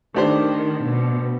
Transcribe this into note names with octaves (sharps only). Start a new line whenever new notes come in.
D#3 A3 D4 G4 C5
B2